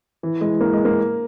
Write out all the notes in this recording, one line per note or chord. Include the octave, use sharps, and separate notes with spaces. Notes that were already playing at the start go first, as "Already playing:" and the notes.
E3
G#3
A#3
G#3
A#3